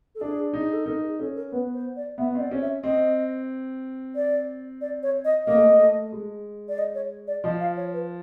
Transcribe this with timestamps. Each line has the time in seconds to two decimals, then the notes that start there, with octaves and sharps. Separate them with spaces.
0.15 A4
0.20 D4 G#4
0.53 D#4
0.60 G#4
0.73 A4
0.86 D#4 A#4
1.03 G#4
1.19 C#4 A4
1.36 A#4
1.52 B3 B4
1.74 C5
1.96 D5
2.18 B3 E5
2.35 C4 D#5
2.40 D5
2.51 C#4
2.61 E5
2.83 C4 D#5
4.16 D5
4.81 D5
5.03 C#5
5.25 D#5
5.47 A#3 D#5
5.55 A3
5.64 A#3
5.80 A3
6.12 G#3
6.68 D5
6.78 D#5
6.95 C#5
7.27 D5
7.43 F3 D#5
7.60 F5
7.77 C#5
7.93 B4